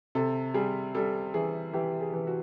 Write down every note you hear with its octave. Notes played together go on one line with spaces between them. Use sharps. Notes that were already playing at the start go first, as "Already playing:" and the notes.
C3 A4
G3 G#4
G3 A4
E3 G#4
E3 G4
G#4
E3
F#4